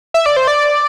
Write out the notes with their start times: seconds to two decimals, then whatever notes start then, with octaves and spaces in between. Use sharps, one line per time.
0.14 E5
0.26 D5
0.36 C5
0.47 D5